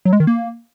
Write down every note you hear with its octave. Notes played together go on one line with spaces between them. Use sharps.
F#3
G#3
D#3
A#3